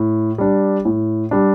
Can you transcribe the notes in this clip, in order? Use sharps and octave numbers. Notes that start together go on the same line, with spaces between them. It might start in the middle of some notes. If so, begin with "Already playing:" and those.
Already playing: A2
G3 D4
A2
G3 D4